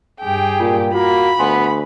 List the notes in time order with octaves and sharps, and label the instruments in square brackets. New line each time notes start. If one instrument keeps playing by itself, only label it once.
[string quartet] G2 G4 G5 [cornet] G#4
[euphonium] A#2 [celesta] F4
[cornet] A#3 [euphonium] F#4 [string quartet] B5
[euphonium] D2 [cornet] B3 [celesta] G#5 C6